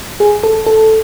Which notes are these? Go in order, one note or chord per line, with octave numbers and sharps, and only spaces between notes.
G#4
A4
A4